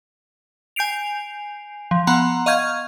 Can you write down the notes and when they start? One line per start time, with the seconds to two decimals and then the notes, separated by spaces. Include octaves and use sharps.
0.76 G#5 G6 C7 D7 F7
1.91 F3
2.07 B3 F#5 A#5 C6
2.46 D#5 F5 C#6 F6 G6 G#6